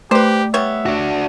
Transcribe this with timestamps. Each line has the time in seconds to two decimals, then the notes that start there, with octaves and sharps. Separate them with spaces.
0.11 A3 G4 B4 C5
0.54 G3 B3 C#5 E5
0.86 D4 F#4